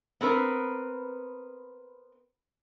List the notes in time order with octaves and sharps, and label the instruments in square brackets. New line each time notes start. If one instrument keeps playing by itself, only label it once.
[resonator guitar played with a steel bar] B3 C4 A#4 B4